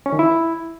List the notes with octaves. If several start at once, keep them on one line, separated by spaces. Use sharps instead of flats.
C#4
D#3
E4